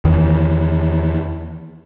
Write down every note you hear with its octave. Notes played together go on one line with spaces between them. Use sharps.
E2 D#3 E3